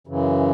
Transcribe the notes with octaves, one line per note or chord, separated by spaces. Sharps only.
F#2 C#3 E3